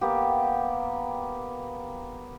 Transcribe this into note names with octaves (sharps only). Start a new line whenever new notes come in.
A#3 B3 G4